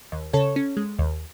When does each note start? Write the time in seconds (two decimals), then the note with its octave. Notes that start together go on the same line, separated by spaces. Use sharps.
0.12 D#2
0.33 C#3 A4 C#5
0.56 C#4
0.77 G#3
0.99 D#2